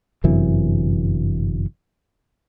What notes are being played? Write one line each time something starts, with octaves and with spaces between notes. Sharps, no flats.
G1 F#2 C3 E3